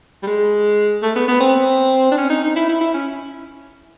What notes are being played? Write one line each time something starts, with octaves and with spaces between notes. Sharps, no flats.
G3
G#3
A3
B3
B3
C4
D4
C#4
D#4
D#4
E4
E4
E4
C#4